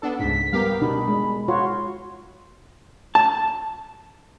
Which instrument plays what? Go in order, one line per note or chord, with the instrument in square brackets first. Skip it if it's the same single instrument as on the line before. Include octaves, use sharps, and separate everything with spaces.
[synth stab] B3 D4 A4
[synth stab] C#2 G#2 [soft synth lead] B6
[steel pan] G3 B3 A#4 [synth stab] G4 F5
[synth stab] B2 [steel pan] D4 D#4 [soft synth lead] B5
[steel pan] G#3
[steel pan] F4 F#4 C#5 [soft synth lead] C6
[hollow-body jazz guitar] A5